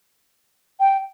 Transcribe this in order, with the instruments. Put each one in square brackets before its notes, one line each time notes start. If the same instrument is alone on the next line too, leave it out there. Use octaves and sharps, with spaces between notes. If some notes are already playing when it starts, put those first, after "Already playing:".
[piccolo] G5